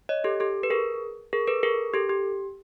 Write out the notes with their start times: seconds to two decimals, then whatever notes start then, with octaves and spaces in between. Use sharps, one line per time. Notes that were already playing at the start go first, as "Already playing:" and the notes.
0.09 C#5 D#5
0.24 G4 A4
0.40 G4 A4
0.63 B4
0.70 G#4 A#4
1.33 G#4 A#4
1.47 A4 B4
1.63 G#4 A#4
1.94 G4 A4
2.09 G4